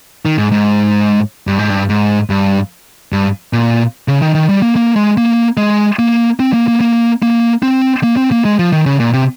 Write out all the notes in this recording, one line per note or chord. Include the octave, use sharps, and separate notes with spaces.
D#3
G#2
G#2
G2
G#2
G2
G#2
G2
G2
A#2
C#3
D#3
D#3
G3
A#3
A#3
G#3
A#3
G#3
A#3
C4
A#3
A#3
A#3
A#3
C4
A#3
C4
A#3
G#3
F3
D#3
C#3
A#2
C3